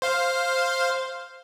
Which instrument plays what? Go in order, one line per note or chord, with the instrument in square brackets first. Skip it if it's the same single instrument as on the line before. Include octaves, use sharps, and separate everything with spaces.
[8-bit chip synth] C5 F5